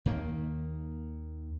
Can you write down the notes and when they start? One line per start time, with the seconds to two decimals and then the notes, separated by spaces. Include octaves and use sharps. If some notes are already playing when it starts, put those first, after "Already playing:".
0.06 D#2 D#3 A#3